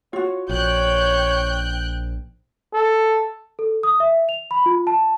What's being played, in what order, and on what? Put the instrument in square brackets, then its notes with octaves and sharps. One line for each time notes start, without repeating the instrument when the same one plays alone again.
[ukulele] F4 F#4 [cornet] C#5
[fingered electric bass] A#1 [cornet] C#5 [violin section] G5 F#6 G6
[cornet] A4
[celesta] A4
D#6
E5
F7
B5
F4
A5